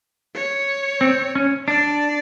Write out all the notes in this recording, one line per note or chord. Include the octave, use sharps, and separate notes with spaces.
C#5
C4
C#4
D4 D5